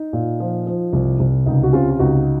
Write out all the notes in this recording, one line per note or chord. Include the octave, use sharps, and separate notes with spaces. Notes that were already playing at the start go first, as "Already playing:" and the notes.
Already playing: D#4
A#2
F3
F3
C2
C2
C#2 D#4
F#4
C3 C#4 F4
F4
C#2 D#4 F#4